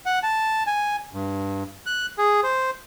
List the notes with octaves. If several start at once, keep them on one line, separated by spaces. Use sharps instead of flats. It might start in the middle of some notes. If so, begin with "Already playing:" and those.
F#5
A5
G#5
G2
F#6
G#4
C5